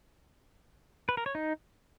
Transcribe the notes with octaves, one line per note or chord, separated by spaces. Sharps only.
B4
A#4
C#5
D#4